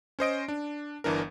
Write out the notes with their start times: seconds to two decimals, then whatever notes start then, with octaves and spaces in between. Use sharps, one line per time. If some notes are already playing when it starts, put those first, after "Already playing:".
0.19 C#4 C5 D#5 D7
0.48 D4
1.04 G1 E3 D4 A#4